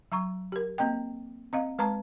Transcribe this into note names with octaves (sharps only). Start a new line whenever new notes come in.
F#3 A#5 C#6
G4 A#4
A#3 C4 D#5 G5
C4 D#5 F5
G#3 B4 A5 A#5